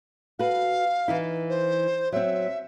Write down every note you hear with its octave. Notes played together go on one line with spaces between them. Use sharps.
F#4 A4 B4 F5
E3 D#4 E4
C5
F#3 C4 E5